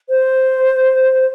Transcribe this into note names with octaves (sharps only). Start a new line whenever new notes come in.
C5